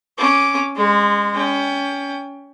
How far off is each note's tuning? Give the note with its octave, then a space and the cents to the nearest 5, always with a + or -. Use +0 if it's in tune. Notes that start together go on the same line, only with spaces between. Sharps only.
C#4 +0 D6 -10
G#3 -30 C6 -20
C#4 +25 G5 +25